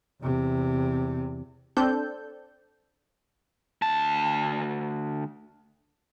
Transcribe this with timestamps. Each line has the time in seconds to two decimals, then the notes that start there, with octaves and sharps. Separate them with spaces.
0.22 E2 C3
1.77 C4 D4 A4 G6
3.82 D2 A5